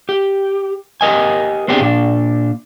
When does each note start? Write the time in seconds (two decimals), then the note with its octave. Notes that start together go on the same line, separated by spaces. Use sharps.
0.09 G4
1.01 G4 A#4 D#5 G#5
1.68 B3 C4 D4 G4 G#4
1.80 A#2 D4